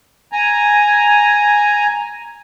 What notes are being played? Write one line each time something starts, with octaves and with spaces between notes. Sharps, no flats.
G#5 A#5